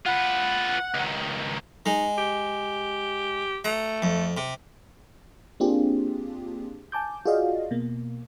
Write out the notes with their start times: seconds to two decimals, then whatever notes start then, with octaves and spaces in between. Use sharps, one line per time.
0.06 F4 B4 F#5
0.94 C#2 D#3
1.86 G#3 D#4
2.18 G4
3.65 A3 A#5
4.02 F2
4.37 C3
5.60 A#3 C4 D4 F4 G4 G#4
6.92 G#5 A5 D6 G6
7.26 F4 F#4 G#4 D5 D#5 F5
7.71 B2 A#3